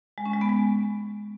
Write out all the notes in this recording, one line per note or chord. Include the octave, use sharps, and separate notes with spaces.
G#3
C#4
G#3
B3
G#3